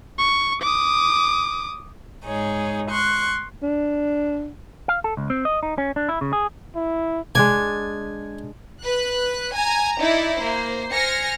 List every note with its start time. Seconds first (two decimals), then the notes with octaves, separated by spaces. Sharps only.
0.19 C#6
0.62 D6 D#6
2.25 G#2 G#3 D#4 G#4 C#5
2.89 C6 C#6 F#6
3.63 D4
4.88 F5
5.04 A4
5.17 C#2
5.30 C4
5.45 D#5
5.63 D#4
5.78 C#4
5.96 D4
6.09 E4
6.21 C#3
6.33 G#4
6.76 E4
7.35 G#3 D4 D5 G#5
8.82 B4 F#6
9.53 G#5 A#5
9.99 D#4 E4 D5
10.39 A#3 C5
10.91 C5 G#5 F6 A#6 C#7